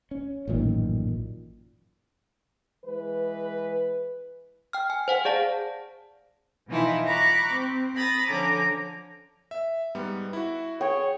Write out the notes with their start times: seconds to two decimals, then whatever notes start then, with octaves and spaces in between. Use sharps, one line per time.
0.11 C#4
0.48 A1 F#2 A#2 D#3
2.84 E3 G#3 B4
4.73 G5 F6
4.90 G#5
5.08 C5 F#5 G#5
5.25 G#4 D5 F5 A5
6.68 B2 E3 F3 D#4 E4
7.06 A#5 B5 C#6 D6 F#6
7.51 C4
7.95 A#5 B5 D#6 A6
8.28 D3 F3 C#4 A#5 D6
9.51 E5
9.95 G#2 G3 B3
10.33 E4 F#4
10.81 G#4 C#5 G5